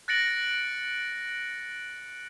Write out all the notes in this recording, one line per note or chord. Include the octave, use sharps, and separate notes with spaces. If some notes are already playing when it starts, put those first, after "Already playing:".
F#6 A6 A#6 C#7 D7 F#7